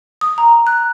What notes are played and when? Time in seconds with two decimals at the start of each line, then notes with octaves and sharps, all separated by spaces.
0.21 D#6
0.38 A#5
0.67 F#6